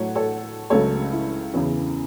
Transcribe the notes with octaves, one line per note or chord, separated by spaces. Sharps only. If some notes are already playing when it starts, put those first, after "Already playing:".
Already playing: A2 F#3 A3 C#5 F#5
A4 C#5
C#2 C#3 F#3 A3 A4 C#5
E4
E2 C#3 E3 C#4